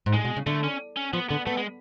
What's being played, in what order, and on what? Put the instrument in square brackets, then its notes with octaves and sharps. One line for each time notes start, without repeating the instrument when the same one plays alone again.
[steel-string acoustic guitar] G#2
[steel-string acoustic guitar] A2 [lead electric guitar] G#3
[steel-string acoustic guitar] B2
C#3
[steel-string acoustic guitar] D3 [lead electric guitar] A3
[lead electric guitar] C#4
C#4
[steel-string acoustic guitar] F3 [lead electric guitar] B3
[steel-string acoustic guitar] D3 [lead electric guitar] B3
[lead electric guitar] A3 [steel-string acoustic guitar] B3
[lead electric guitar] G#3